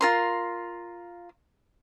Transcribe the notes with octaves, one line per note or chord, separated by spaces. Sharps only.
F4 A#4 C6